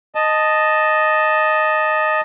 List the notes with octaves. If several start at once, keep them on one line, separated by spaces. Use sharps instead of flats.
D#5 A5